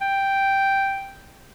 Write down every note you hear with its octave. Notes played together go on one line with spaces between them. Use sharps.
G5